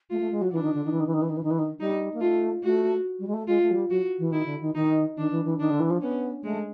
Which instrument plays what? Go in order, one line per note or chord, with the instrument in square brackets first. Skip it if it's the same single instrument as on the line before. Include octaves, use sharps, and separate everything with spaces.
[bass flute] A3 [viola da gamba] F4
[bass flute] A3
G#3
F#3
[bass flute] E3 [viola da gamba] D4
[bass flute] D#3
D3
D#3
E3
D#3
E3
D#3
E3
D#3
E3
D#3
E3
D#3
[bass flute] G3 [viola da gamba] D#4
[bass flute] A#3
[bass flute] A3 [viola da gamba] F4
[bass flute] A3 [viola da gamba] F#4
[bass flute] G3
G#3
A3
[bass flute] G#3 [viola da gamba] F4
[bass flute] A3
F#3
G3
[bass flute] F#3 [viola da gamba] F#4
[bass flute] E3
[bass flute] D#3 [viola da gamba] E4
[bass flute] D3
D#3
[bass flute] D#3 [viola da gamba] D#4
[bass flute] D#3 [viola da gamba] D4
[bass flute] E3
E3
[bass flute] D#3 [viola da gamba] D4
[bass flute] D3
E3
F3
[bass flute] B3 [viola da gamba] C#4
[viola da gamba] G#3 [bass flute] A3